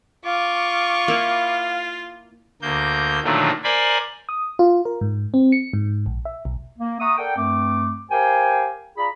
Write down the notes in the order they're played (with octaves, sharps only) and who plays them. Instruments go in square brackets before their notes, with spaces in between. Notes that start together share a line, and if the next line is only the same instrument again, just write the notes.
[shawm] F4 [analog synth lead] F5 [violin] C#6 D6
[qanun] A#3 E4
[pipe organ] D2 A#3 G6
A#2 D3 D#3 F3 F#3 A3
A#4 C5 D5 G#5 B5
[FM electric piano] D#6
F4
A#4
G#2
C4
C#7
G#2
A#1
E5
B1
[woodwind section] A#3
E5 F#5 A#5 C#6 D#6
A4 A#4 D5 F#5 G5
G2 A3 C4 D6
G4 A#4 C5 F5 G5 G#5
F4 G#4 D5 A#5 B5